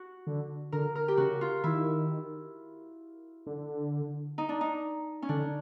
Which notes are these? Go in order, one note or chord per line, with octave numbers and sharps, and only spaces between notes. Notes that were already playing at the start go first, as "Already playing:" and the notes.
Already playing: F#4
D3
D3 A#4
A#4
G4
C#3 F#4
F4
D#3 E4
D3
D#4
D4
D#4
C#4
D3 D4